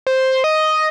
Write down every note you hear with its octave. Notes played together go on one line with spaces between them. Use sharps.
C5
D#5